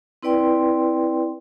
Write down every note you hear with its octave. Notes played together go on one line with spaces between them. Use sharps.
C4 E4 B4 D5 G5 C6